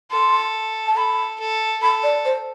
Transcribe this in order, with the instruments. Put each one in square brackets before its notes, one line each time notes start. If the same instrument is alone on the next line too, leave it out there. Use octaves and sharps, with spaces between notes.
[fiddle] A4 [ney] C6
[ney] A5
[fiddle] A4 [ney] B5
[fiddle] A4
[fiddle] A4 [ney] B5
[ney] D5
C5